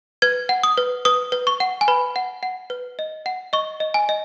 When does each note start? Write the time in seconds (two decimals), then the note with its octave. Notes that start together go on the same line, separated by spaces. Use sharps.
0.22 B4 G#6
0.49 F#5
0.63 D#6
0.78 B4
1.05 B4 D#6
1.32 B4
1.47 C#6
1.60 F#5
1.81 G#5
1.88 B4 B5
2.16 F#5
2.43 F#5
2.70 B4
2.99 D#5
3.26 F#5
3.53 D#5 C#6
3.80 D#5
3.94 G#5
4.09 D#5